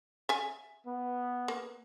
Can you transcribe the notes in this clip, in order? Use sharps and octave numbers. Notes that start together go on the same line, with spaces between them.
E5 G#5
B3
A#3